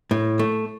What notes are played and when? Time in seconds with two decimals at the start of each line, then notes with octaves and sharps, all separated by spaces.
0.11 A2
0.39 A3